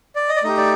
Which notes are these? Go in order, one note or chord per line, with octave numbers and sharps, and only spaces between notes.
D5
D#5
D5
A3 D#4 G4 D#5
D5